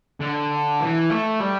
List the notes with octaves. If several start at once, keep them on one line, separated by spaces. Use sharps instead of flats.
D3
E3
A3
G3